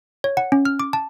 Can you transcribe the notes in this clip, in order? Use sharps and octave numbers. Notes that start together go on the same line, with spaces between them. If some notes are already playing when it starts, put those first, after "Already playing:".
C#5
F#5
C#4
F6
D6
A5